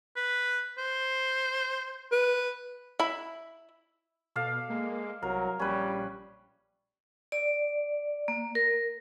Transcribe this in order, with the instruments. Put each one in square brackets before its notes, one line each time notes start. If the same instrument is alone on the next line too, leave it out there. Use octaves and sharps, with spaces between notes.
[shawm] B4
C5
[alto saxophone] B4
[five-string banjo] E4 B5
[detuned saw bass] B2 [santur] A4 D5 F5
[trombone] G#3 [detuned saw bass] A#3
[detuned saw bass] C2 [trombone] F#3 [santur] A#4
[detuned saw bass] A#1 [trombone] G3 [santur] C#4 B4
[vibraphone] D5
A#3
A#4